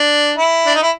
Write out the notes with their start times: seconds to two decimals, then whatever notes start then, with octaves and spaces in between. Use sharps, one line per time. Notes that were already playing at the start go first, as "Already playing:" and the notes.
Already playing: D4
0.38 E4
0.66 D4
0.75 D#4
0.83 E4